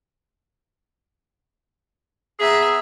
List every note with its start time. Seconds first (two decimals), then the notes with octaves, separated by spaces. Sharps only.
2.40 B3 G#4 E5 A#5